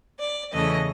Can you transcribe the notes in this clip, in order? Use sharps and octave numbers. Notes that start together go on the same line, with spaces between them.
D5
E2 C#3 E3 A3 D#5